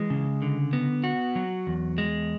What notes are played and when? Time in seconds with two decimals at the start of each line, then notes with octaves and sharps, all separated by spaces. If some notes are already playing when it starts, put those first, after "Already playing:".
Already playing: E3 G#3
0.10 C#3
0.42 D3
0.73 B3
1.04 F#4
1.36 F#3
1.67 E2
1.98 G#3